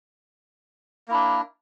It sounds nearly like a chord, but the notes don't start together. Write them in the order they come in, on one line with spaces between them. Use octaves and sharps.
A#3 E4 D4